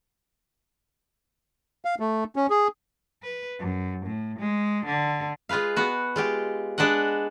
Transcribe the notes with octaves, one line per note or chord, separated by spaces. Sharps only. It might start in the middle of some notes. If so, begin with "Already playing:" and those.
F5
A3
C#4
G#4
B4
F#2
A2
G#3
D3
G#3 F4 G#4 B4 F5
B3 F#4
G#3 F4 G4
G#3 D4 B4 D#5 F#5